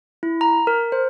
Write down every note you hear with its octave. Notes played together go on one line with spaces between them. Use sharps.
E4
A#5
A#4
C5